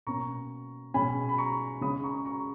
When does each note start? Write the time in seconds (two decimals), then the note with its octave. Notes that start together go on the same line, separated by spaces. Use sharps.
0.07 B2 A#3 C#4 A#5 C#6
0.94 B2 G#3 C#4 G#5 B5
1.29 B5
1.38 A#5 C#6
1.81 C#3 G#3 C#4 B5 D#6
2.04 A#5 C#6
2.25 A#5 C#6